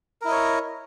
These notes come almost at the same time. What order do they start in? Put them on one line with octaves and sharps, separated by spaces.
A#4 E4 D#5 C#5